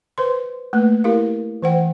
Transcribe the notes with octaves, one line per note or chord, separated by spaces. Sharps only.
B4 C5 C6
A3 A#3 B4
E4 G4 A#4 F5
E3 C5 F#5 G5